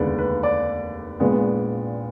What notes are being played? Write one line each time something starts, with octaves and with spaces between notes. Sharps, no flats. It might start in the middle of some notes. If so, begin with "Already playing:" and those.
Already playing: F1 D#2 D3 G#3 B3 B4 D5
B4
D5
A#1 A#2 G#3 B3